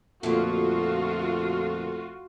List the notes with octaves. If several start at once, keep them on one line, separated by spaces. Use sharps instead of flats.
F2 A#2 D3 A3 A#3 F4 F#4